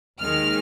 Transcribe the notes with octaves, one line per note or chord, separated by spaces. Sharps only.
D#2 D#3 G#3 F6